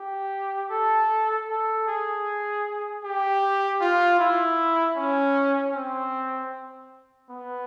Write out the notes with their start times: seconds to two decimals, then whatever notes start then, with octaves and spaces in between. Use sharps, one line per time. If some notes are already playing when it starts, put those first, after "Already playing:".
Already playing: G4
0.71 A4
1.48 A4
1.87 G#4
3.04 G4
3.80 F4
4.19 E4
4.96 C#4
5.75 C4
7.30 B3